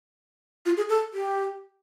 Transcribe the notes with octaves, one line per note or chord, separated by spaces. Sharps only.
F4
G#4
A4
G4